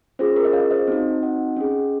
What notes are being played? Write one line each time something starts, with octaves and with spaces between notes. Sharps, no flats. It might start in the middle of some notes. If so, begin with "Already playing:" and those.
C#4 F4 G#4 C5
A#4
D#5
C#5 F5
C5 D#5
C4 D#4 F#4
D#5 F#5
C#4 G#4